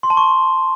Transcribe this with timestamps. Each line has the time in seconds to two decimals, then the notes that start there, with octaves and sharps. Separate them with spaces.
0.03 C6
0.10 A5
0.17 C#6